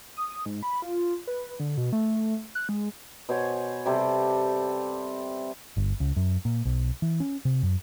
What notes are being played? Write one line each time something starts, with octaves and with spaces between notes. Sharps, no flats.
D#6
G#2
B5
F4
B4
D3
B2
A3
F#6
G#3
B2 C5 C#5 G#5
C3 G3 G4 A4
G1
C#2
F#2
A#2
B1
E3
C#4
C3
F#2